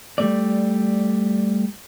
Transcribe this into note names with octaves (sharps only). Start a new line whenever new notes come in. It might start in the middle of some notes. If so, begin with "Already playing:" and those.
G3 A3 D5